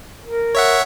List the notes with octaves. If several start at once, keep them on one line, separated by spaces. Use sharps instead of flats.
A#4
C#5 E5 F#5